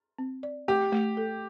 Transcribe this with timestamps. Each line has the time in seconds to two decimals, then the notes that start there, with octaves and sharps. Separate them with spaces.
0.18 C4
0.43 D5
0.68 A3 G4
0.92 A3
1.17 A4